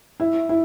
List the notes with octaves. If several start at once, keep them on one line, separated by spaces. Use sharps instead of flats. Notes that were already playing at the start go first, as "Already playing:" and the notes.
E4
E4